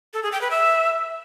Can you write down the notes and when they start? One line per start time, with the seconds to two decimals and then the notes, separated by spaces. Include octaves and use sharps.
0.14 A4
0.23 G#4
0.32 G5
0.41 B4
0.51 E5